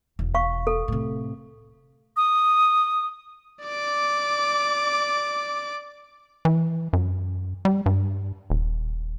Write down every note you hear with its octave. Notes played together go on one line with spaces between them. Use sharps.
E1
F5 C#6
A4
A2 C3
D#6
D5 D6
E3
F#2
G3
G2
D#1